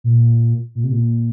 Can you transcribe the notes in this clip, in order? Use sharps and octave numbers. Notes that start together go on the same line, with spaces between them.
A#2
A#2
C3
A#2